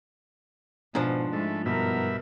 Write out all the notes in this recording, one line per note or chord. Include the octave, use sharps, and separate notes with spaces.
G#2 B2 F3 D4
G#3 A3 E4
G2 B2 B3 A#4 E5 B5